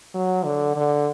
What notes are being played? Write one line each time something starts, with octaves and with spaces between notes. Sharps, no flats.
F#3
D3
D3